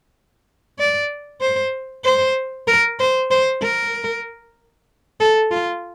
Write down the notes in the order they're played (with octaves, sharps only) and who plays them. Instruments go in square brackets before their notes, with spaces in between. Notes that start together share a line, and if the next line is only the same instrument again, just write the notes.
[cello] D5
C5
C5
A#4
C5
C5
A#4
A4
F4